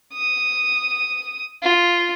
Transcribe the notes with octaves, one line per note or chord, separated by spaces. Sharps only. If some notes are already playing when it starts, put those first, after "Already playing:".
D#6
F4